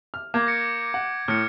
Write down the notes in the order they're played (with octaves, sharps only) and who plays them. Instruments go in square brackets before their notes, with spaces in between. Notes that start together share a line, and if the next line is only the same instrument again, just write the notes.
[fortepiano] F6
[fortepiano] A#3 [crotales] D6 G6 G#6
[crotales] A#6 C#7 D7
[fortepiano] F#5
[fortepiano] A2 [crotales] F6 C#7